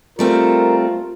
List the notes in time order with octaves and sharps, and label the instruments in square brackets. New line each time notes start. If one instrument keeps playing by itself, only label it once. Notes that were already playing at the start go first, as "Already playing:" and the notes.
[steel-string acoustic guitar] G3 A3 C4 [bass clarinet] F4 [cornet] A#4